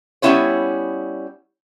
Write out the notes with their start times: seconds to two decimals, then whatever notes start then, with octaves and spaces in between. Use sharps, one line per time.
0.22 G3 B3 C#4 E4 C5 C#5